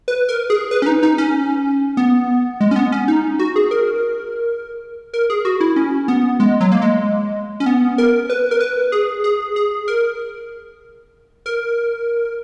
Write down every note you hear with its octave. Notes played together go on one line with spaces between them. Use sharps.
B4
A#4
G#4
B4
C#4
D#4
D#4
C#4
B3
G#3
C#4
B3
C#4
D#4
F#4
G#4
A#4
A#4
G#4
F#4
E4
C#4
B3
G#3
F#3
A#3
G#3
C#4
B3
A#4
B4
A#4
B4
G#4
G#4
G#4
A#4
A#4